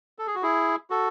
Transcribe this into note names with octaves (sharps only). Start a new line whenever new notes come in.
A4
G#4
F#4
E4 G#4
F#4 A4